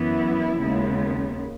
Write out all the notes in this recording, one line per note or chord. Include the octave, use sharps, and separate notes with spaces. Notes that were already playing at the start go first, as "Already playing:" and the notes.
Already playing: F#2 E3 B3 E4
D#2 C#3 G#3 B3